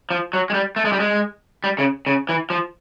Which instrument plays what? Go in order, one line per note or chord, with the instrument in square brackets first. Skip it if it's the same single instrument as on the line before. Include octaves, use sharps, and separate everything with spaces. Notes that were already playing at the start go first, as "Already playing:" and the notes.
[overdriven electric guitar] F3
F#3
G#3
G3
A3
G#3
G3
G#3
G3
C#3
C#3
E3
F3